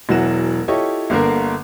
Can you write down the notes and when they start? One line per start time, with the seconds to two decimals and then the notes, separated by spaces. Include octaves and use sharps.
0.09 E1 E3 F#3 E4 F#5 E7
0.68 E4 F4 G4 A4 C#5 D#5
1.10 G1 D3 A#3 A#4